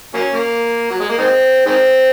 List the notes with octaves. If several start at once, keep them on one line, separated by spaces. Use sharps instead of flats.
F#3 A#3 C#4
A#3
F#3
G#3
A#3
D#3 G#3 C4
D#3 G#3 C4